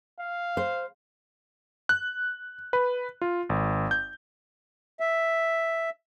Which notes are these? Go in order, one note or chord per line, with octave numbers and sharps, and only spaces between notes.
F5
C5
F#6
B4
F4
G#1
G6
E5